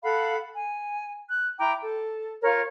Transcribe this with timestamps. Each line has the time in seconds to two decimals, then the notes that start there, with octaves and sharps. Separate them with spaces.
0.03 A4 F5 F#5 B5
0.53 G#5
1.28 F#6
1.58 E4 G5 A#5 D6
1.81 A4
2.42 F4 A#4 C#5